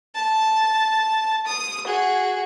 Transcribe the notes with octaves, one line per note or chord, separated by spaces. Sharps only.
A5
D#6
F#4 G#4